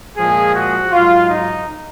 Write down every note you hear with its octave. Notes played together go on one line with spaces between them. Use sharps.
A#2 F3 G#3 G#4
F#4
G#2 F#3 F4
D#4